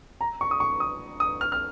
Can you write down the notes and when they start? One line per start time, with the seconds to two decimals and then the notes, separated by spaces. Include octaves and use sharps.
0.21 A#5
0.41 C#6
0.51 D#6
0.60 C#6
0.80 D#6
1.20 D#6
1.41 F6
1.52 F6